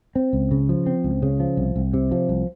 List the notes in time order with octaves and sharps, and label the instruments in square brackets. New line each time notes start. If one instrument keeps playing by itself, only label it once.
[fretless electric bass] C4
C#2
C#3
F3
C4
C#2
C#3
F3
C2
C2
C3
F3
C2